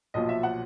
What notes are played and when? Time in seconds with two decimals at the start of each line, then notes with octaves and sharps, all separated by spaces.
0.14 B1 A#2 F3 D#5
0.29 E5
0.43 F#5